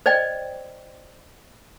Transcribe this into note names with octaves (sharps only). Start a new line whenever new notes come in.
C5 D5 D#5 G5